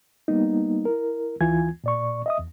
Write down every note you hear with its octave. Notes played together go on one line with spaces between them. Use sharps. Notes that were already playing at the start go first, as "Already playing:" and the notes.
G3 A#3 B3 D#4
E4 A#4
D2 E3 F4 G#5 G#6
A#2 D5 C#6
D#5 E5 D#6
E2